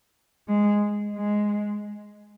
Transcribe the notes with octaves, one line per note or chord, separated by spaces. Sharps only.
G#3
G#3